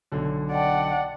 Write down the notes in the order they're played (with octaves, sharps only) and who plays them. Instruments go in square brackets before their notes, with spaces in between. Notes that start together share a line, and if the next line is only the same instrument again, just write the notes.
[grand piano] B1 D3
[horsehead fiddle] D5 F#5 [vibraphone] D#5 G5 A5